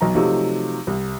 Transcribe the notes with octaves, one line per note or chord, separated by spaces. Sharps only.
B1 A#5
C3 F3 F#3 A3 D#4
C2